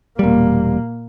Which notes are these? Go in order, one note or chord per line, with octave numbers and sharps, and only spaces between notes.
E1 A#2 G3 A#3